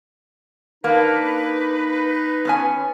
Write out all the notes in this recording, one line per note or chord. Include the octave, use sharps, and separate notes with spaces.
A#3 D4 D#4 B4
B3 C#4 G#5